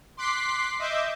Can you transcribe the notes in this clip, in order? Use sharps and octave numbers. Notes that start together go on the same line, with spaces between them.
C6 D6 F#6 B6 C7
D#5 E5 D6 G6